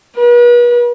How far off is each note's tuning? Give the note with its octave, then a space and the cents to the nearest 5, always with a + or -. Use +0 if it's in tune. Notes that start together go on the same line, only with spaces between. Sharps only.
B4 -40